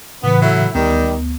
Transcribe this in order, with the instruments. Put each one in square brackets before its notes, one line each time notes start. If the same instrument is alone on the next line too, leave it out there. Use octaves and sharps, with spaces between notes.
[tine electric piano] A2 C#3 E3 [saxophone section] B3
[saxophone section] F#3 A3 E4
[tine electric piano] D2 B3 [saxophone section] D#3 G3